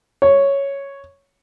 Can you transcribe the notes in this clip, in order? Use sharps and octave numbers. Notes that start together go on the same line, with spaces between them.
C#5